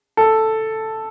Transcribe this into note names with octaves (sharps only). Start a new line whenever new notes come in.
A4